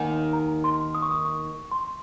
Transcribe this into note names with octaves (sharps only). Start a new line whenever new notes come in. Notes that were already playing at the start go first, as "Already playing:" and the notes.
Already playing: D#2 D#3 F#5 G#5
A#5
C6
D#6
C#6
D#6
C#6
C6